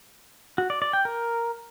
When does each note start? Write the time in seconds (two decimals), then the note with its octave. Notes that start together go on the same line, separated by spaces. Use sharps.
0.58 F#4
0.70 D5
0.82 D5
0.93 G5
1.05 A#4